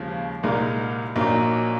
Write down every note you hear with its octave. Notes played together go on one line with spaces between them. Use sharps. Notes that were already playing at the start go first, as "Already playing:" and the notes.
Already playing: D#2 C#3 F3 G#3
C2 A#2 G#3 D#4 A#4
A#1 A#2 F#3 A#3 D#4